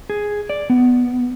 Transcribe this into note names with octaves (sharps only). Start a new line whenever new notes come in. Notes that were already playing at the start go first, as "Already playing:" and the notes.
G#4
D5
B3